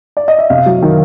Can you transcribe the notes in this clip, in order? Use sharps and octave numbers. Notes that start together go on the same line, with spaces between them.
D5
D#5
E5
C3 F5
F#3
D#3